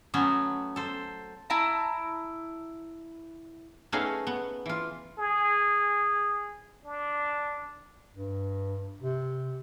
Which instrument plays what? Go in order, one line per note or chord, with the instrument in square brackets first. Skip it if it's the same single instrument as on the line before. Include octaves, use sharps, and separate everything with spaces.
[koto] F#3 A3 B3 C#4
A4 C5
[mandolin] E4 A5 A#5
[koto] A3 B3 C#4 D#4 G#4 F5
B3
E3 F4
[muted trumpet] G#4
D4
[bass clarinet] G2
C3